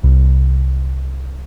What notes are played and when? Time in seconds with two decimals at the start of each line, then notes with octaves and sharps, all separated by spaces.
0.03 C2